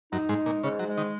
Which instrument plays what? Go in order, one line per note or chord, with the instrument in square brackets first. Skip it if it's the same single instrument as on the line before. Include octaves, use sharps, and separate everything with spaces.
[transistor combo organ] F#2 [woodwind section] D#4
[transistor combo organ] G#2
[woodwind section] G#3
[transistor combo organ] A#2
[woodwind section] G#2 [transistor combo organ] C#3
[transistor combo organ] F#3
[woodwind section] G#3
[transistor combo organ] D#3